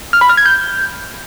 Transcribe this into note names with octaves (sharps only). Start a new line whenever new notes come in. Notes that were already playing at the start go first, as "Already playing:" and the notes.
F6
B5
F6
G#6
G6